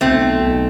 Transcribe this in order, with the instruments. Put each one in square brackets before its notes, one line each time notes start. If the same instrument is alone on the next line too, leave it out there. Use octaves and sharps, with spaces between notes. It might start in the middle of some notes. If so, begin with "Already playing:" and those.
[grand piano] B1 [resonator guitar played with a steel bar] A3 C4
[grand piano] B1